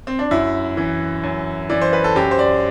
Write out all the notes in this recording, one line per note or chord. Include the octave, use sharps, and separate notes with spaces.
C4
D4
F#2 E4
E3
F#2
E3 D5
C5
B4
A4
F#2 G4
C5
D5